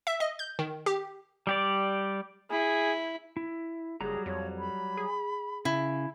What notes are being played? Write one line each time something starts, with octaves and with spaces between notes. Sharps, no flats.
E5
D#5
G6
D#3
G4
G3 G4 D5
E4 G#4
E4
F#1 F#3 G3 G#4 A#5
F2 C#5
B5
G#4
C#3 E4